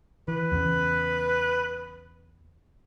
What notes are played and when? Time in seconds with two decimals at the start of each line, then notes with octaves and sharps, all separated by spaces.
0.28 E3 B4
0.52 E2 C#3